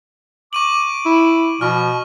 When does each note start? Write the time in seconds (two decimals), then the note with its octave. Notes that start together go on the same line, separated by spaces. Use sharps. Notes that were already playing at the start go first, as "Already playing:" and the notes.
0.53 C#6 D6 D#7 F#7
1.06 E4
1.61 B2 F3 C#6 F6